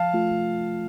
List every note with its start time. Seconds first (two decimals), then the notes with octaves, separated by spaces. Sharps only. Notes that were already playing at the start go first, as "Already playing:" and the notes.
Already playing: F3 F5 A5
0.14 A3 F4